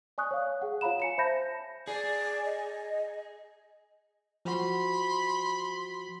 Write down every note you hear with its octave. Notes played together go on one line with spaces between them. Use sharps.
D5 G#5 C#6 D#6 F#6
C#5 F5
G#4 F#5
F4 C#5 F5 A#5 B5 E7
G#5 C#7 E7
C5 E5 A5 B5 G6 A#6
G#4 D5
D#5
F3 F#4 B5 C6